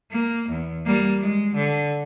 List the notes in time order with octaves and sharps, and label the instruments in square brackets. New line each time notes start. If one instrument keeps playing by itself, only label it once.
[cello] A#3
E2
G3 A#3
G#3
D3